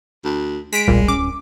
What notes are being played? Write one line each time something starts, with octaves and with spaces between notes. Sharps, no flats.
D2
G#3 B6 D7
D#1 B1 A#2 G3
D1 C#4 D6